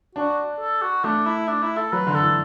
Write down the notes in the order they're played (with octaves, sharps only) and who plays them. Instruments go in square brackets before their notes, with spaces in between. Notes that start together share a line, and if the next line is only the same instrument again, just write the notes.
[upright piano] D4 [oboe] F#4
[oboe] A4
F#4
[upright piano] A3 [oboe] D4
[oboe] E4
D4
E4
A4
[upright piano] F#3 [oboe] B4
[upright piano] D3
[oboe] A4
[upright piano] E3